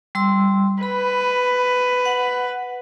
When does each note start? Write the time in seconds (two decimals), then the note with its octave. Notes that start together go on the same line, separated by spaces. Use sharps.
0.15 G3 C6 E6
0.83 B4 B5
2.05 F#5